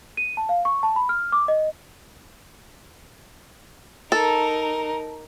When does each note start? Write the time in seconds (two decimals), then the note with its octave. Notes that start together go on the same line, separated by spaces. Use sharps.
0.17 D#7
0.37 A5
0.49 F5
0.65 C#6
0.83 A5
0.96 B5
1.09 F6
1.32 D6
1.48 D#5
4.12 D#4 A4 A#4